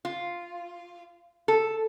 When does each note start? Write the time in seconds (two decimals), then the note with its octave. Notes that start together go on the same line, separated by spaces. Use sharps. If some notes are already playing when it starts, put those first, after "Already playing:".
0.05 F4
1.48 A4